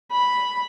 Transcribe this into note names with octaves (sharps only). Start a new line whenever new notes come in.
B5